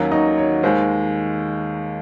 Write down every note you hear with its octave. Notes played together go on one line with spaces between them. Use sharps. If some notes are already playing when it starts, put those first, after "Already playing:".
Already playing: D#2 D#3 F#3 C#4 F#4 F#5
D#4 D#5
C#5
D#2 D#3 G#3 C5